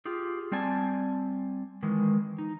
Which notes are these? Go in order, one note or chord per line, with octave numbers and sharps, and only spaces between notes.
F4 G4 G#4
G3 C4 D5 G#5 A5
D#3 E3 G#3
D#4